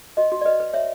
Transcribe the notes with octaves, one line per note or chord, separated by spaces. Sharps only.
F#4 D#5
F#4
D5
B4 D#5
B4
C#5 E5